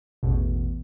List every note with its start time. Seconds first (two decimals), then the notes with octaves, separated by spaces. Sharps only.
0.23 A1 E2 B2